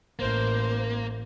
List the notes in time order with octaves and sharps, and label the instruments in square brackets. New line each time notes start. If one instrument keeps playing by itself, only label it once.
[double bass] A1 [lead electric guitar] A#3 [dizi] C5